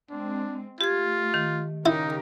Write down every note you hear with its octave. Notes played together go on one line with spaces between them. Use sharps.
G#3 C4 D4
A3 F4 G4 G#6
D#3
C#3 D#4 E4 G4 A#4